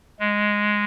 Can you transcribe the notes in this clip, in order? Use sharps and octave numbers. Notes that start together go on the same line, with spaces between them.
G#3